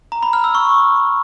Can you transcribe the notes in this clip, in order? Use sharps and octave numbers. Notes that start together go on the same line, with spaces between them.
A#5
B5
F6
E6
C#6